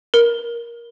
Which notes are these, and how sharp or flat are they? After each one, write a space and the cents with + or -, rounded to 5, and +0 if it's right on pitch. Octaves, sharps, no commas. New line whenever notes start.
A#4 +15